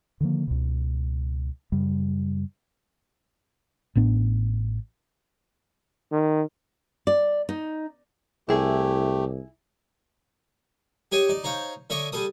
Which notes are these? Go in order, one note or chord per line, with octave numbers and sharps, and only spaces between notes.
D3 D#3 F3 A#3
C#2 B2
F#2 C#3 G3
A1 A2 B3 D4
D#3
D5
D#4
C2 A3 E4 G4 G#4
G4 G#4 C#5 D#5 G#5
D#4 D5
D#4 C5 C#5 F5
D3 A4 C#5 D#5 E5 D6
G3 G#4 A4 D#6